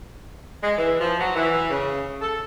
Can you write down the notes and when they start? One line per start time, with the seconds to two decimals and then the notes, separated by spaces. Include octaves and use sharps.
0.62 G#3
0.78 E3
1.00 F3
1.19 F#3
1.35 E3
1.69 C#3
2.21 A4